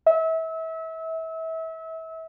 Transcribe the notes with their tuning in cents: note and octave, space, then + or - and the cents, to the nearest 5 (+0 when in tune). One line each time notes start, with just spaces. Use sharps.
E5 -30